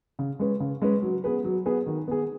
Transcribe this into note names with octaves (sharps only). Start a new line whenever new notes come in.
C#3
G#3 C#4 B4
C#3
G#3 C#4 B4
F#3
B3 G#4 B4
F#3
B3 G#4 B4
D#3
B3 G#4